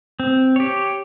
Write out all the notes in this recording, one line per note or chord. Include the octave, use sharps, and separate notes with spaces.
C4
G4 C#5